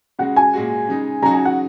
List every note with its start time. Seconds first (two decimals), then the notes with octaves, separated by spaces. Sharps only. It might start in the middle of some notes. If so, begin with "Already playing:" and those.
0.19 C#3 G#3 F#4 F#5
0.36 G#5
0.53 A#2 G#3 F#4
0.88 C#3 G#3 D#4
1.22 C#3 F#3 D#4 F#4 A#5
1.33 G#5
1.45 F#5